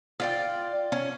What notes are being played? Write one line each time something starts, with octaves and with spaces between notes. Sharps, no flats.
F4 D5 G5
C#4